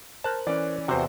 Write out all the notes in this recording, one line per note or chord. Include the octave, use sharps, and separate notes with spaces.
A#4 C5 A5 F#6
E3 C#4 D5
E2 C3 F#4 C5